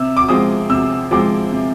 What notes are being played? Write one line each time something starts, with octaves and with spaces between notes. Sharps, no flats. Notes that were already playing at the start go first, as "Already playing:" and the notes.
Already playing: C3 E6
D6
F3 G#3 C4 D#6
C3 E6
F3 G#3 C4 D6
C3